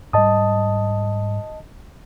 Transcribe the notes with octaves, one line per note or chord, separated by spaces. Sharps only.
G#2 G3 D#5 A5 D#6